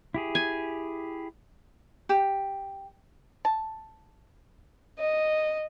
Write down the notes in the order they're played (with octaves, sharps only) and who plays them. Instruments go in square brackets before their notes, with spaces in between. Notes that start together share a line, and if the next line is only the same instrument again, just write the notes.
[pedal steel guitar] E4 G4 G#4
[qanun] G#5
[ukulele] G4
[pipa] A5
[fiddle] D#5